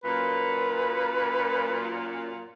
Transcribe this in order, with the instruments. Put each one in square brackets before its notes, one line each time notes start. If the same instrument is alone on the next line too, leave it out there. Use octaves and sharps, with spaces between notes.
[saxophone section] F#2 A#2 [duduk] B4